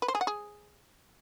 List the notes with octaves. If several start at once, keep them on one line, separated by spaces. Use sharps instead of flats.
B4
C5
G#4
F#5
G#4